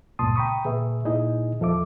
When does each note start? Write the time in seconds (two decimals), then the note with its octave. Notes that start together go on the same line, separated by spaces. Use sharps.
0.19 C#2 G2 A#2 A5 C6 D#6
0.36 G5 A#5 B5 C#6 D#6
0.65 A#2 G#4 B4 E5
1.05 A#2 D#4 E4 G#4 D#5
1.60 E2 F3 A4 E5 D6